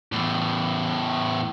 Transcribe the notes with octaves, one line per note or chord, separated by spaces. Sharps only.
E2 A2